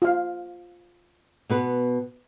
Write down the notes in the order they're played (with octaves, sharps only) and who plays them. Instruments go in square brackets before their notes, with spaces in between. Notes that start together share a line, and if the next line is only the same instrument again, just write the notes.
[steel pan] F4 F5
[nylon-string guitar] B2 B3 B4